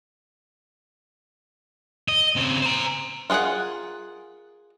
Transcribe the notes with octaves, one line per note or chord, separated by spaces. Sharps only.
D#5
C#3 C4
C5 A#5
F4 F#4 G#4 A#4 F#5